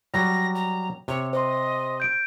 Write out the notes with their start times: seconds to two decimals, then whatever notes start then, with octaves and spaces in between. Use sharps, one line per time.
0.14 F#3 G3 A#6
0.55 A#5
1.08 C3 C#5
1.33 C5 D#5 C6
2.00 G6 D7